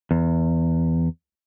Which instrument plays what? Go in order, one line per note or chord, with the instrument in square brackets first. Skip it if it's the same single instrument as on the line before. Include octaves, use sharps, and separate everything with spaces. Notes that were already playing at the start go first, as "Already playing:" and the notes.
[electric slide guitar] E2